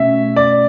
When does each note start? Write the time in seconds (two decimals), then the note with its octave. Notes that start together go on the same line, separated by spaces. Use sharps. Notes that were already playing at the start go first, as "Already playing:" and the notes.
Already playing: B2 A3 C#4 E5
0.36 D5